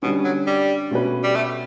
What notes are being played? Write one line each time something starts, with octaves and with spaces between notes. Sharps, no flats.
B2 D3 G3 C#4
F#3
G3
B2 A3 C#4 F#4 B4
G3
A3